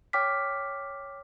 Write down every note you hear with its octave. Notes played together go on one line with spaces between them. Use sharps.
C#5 G5 D6 F6 B6